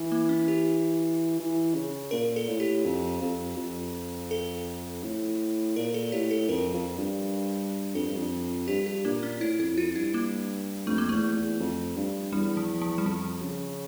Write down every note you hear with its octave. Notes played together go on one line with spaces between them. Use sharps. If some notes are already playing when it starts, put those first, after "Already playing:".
Already playing: E3
A#3
C#4
G4
E3
C#3
A#2 A#4
A4
A2
G4
F2
F2
F2
A4
A2
A#2 A#4
A4
A2 G4
A4
F2 A#4
F2
G2
F2 A4
G2
F2
G2 G4
G4
A#2 A#3
C#4
A2 E4
F2 E4
F2 F4
G2 E4
A#3
F2 A3
A#3
E2 A3
E2
F2
G2
E2 G3
F3
F3
G3
F2 F3
C#3